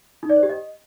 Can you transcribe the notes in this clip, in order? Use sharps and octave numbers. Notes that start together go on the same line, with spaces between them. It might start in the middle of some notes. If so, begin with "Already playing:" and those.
D#4
D5
C5
G4
D#5